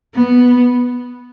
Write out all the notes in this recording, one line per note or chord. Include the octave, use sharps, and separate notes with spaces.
B3